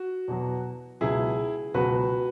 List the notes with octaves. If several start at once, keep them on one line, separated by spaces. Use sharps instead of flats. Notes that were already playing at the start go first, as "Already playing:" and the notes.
Already playing: F#4
E2 B2 F#3
C#2 B2 F#3 E4 G#4
C#2 B2 F#3 F#4 B4